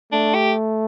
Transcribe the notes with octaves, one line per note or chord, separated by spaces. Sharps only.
A3 D4
G4